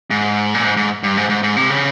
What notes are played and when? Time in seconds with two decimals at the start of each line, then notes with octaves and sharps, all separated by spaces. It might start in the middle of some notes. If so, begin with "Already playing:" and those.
0.10 G#2
0.54 A#2
0.64 G#2
0.77 G#2
1.03 G2
1.17 G#2
1.29 G#2
1.43 G#2
1.57 C3
1.70 C#3